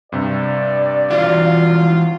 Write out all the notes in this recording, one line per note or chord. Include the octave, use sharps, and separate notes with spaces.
G2 C3 D5
E3 F4 F#4